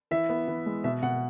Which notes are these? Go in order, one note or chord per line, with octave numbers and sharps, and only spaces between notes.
E3 E5
B3
E3
G#3
B2 E5
B2 F#5